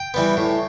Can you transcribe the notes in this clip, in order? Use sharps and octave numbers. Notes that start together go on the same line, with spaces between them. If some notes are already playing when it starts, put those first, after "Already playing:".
Already playing: G5
E3 G3 B3
A2